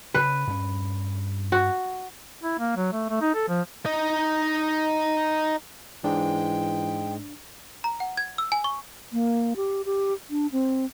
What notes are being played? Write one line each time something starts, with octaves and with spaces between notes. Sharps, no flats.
C#3 B4
G2 C#4
F#4
E4
A#3
F#3
A3
A3
D#4
A4
F3
D#4 D#5
G#2 E3 G#3 D4 G5
A#5
F#5
G#6
E6
G#5
C#6
A#3
G4
G4
D4
C4